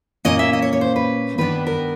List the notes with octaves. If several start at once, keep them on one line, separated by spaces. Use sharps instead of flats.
A#2 F3 A#3 C#4 D#5
E5
D#5
C#5
C#5
C5
B4
G2 D#3 G3 B3 D4 B4
A#4